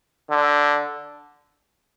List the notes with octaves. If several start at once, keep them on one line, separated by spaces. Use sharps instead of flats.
D3